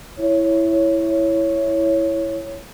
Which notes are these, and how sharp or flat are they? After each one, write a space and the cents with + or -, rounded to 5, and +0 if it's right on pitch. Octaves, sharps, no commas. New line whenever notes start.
E4 +0 C#5 +0